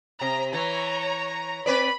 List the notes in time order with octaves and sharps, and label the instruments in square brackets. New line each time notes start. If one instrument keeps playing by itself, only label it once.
[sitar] C3 [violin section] A#5
[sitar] E3 [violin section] C#5 A#5
[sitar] C4 B4 D5 [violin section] B5